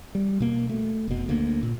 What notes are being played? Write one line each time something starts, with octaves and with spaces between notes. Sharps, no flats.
G3
B2 A#3
A3
F1 B2
D2 A#3
A#2